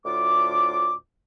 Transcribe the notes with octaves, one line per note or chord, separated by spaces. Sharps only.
D2 A2 F4 D6